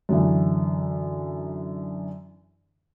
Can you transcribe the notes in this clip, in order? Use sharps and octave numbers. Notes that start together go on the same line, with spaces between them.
F#2 D3 E3